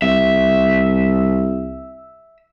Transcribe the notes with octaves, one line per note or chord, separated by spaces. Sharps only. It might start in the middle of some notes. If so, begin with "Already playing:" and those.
C2 E5